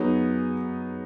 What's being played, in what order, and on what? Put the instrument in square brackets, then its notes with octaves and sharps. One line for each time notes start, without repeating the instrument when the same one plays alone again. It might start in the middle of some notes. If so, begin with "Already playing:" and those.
Already playing: [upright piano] F#3 B3 D#4 G#4